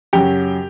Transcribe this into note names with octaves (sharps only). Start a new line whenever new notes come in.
F#2 C#3 F#3 G4 G5